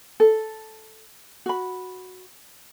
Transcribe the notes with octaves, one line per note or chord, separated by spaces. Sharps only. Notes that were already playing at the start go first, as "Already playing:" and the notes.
A4
F#4 B5